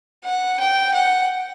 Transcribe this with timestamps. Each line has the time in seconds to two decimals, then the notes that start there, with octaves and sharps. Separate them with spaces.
0.24 F#5
0.60 G5
0.94 F#5